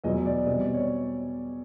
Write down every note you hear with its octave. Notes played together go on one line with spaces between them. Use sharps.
E2 B2 F#3 D#5
D5
B2 G3 C4 D#5
D5
C#5